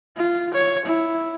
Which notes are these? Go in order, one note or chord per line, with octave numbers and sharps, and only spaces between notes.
F4
C#5
E4